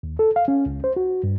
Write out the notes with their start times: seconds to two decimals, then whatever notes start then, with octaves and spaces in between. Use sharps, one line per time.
0.03 D#2
0.19 A4
0.36 F5
0.48 C#4
0.66 C#2
0.84 C5
0.96 F#4
1.24 G2